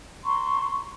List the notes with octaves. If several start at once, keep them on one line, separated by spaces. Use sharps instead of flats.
A#5 C6 C#6